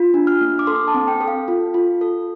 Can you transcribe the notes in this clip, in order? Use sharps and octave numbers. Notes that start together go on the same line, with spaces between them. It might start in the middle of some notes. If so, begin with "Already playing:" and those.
Already playing: F4
D4
F6
A#3
D6
A4 C6
A5
C4
G5
A4
F5
F4
F4
A4